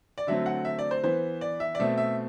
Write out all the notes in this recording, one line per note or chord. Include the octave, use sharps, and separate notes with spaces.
D5
D3 F#3 A3 C4 E5
F#5
E5
D5
C5
E3 B3 C5
D5
E5
D5
B2 A3 C4 E5
E5